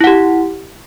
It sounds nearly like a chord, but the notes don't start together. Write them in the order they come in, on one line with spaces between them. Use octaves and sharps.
E4 F#5 G4